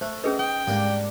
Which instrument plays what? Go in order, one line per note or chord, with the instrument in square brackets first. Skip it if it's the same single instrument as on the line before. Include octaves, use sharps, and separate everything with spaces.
[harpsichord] A3 [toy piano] C5
[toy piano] C#4 G#4 B4 [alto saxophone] D#5
[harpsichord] D#4 [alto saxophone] G5
[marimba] G#2 G#3 [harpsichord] G3 A#3 D4